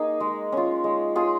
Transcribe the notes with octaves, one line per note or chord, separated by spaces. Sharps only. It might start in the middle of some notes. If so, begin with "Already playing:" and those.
Already playing: A#3 D#4 G#4
G#3
C#4 F4
G#3
F4 G#4